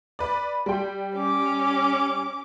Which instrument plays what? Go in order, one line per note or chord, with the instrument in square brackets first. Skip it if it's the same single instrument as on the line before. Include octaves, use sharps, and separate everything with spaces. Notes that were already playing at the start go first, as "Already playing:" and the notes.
[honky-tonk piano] B4 D5
G3 G5
[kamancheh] C#4 D6